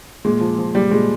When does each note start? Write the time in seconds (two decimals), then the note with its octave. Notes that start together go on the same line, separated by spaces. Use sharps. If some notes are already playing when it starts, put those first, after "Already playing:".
0.25 A#2 G#3
0.41 F3
0.58 F3
0.74 A#2 G3
0.91 A#2 G#3